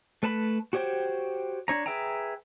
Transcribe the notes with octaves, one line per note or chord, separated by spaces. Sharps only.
A3 B4 A5 B5
F#4 G4 C5 C#5 G5
D4 C#5 A#5
G#4 B4 E5 G5 A#5